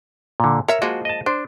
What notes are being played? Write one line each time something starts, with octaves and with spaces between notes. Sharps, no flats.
A#2 D3
A#4 C#5 E5
F3 G#3 A#3 F#4
D#5 A5
D4 C5